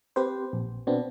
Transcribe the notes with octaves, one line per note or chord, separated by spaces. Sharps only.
C4 G4 B4 C5
A#1
B2 B3 C4 D4